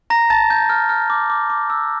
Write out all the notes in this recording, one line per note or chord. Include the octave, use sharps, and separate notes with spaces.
A#5 A#6
A5 A6
G6
F6
F6
D6
D6
D6
E6